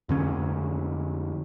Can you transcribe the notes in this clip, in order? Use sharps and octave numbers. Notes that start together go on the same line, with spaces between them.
F2 D3 C#4